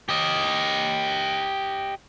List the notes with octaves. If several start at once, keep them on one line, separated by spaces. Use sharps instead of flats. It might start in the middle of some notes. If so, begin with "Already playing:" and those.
G4 D#5